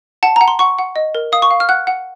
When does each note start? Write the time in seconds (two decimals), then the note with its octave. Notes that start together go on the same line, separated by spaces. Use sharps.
0.23 F#5 A5
0.36 F#5 A#5
0.48 C6
0.59 F#5 C#6
0.79 F#5
0.96 D#5
1.15 A#4
1.32 F5 D#6
1.42 C#6
1.51 F5
1.60 F6
1.69 F#5 F#6
1.87 F#5